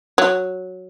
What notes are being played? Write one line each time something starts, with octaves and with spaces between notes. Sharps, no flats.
F#3